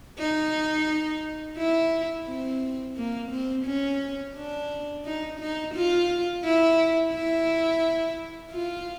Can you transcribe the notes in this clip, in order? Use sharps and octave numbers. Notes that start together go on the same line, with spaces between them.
D#4
E4
C4
A#3
C4
C#4
D4
D#4
D#4
F4
E4
E4
F4